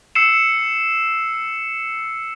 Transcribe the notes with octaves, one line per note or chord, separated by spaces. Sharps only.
E6 C7 C#7 E7